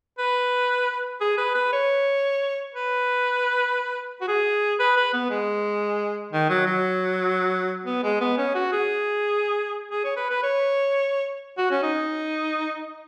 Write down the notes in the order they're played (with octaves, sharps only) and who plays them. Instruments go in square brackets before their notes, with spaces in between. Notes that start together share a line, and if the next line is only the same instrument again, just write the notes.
[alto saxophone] B4
G#4
B4
B4
C#5
B4
F#4
G#4
B4
B4
B3
G#3
D#3
F#3
F#3
B3
G#3
B3
C#4
F#4
G#4
G#4
C#5
B4
B4
C#5
F#4
C#4
D#4